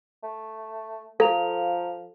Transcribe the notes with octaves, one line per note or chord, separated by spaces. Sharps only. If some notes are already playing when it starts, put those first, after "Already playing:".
A3
F3 A4 F5 A#5 F7